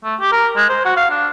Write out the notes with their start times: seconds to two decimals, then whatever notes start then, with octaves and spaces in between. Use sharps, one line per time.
0.04 A3
0.20 G4
0.32 A#4
0.57 G#3
0.69 C5
0.85 F#4
0.97 F5
1.10 D4